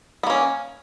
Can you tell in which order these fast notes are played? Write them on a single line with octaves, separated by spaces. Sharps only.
B3 A#3 C#4